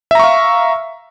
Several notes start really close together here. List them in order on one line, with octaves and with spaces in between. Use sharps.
E5 A#5 C#6 F5